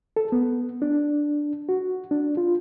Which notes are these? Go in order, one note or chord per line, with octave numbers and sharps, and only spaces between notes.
A4
B3
D4
F#4
D4
F4